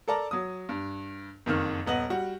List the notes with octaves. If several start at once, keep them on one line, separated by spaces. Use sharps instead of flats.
A4 A#4 D5 A5 A#5
F#3 D#6
G2
F#1 F2 D#3 F6
D#1 B3 D#5 F#7
G3 F#4